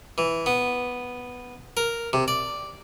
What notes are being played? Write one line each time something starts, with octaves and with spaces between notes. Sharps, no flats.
E3
B3
A#4
C3
D5